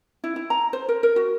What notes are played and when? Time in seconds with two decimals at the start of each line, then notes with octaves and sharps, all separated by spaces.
0.24 E4
0.36 E4
0.50 A#5
0.73 C5
0.89 A#4
1.03 A#4
1.16 F#4